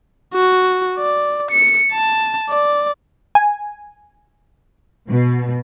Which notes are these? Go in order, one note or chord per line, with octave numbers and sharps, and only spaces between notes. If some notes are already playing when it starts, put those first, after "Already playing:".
F#4
D5
C#7
A5
D5
G#5
B2